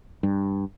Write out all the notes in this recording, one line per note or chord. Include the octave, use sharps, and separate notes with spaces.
G2